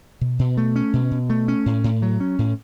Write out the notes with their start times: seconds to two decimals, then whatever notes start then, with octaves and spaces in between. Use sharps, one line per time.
0.21 B2
0.39 B2
0.57 A3
0.76 C#4
0.93 B2
1.11 B2
1.30 A3
1.48 C#4
1.66 A2
1.84 A2
2.02 F#3
2.20 C#4
2.39 A2